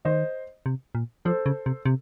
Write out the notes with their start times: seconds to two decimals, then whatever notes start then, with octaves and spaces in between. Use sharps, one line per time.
0.05 D#3 C5 D#5
0.66 C3
0.95 A#2
1.25 F3 A4 C5
1.46 C#3
1.66 C3
1.86 C3